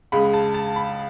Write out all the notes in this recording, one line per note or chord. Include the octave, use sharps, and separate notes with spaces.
C#2 C#3 G#3 B5
A5
A5
B5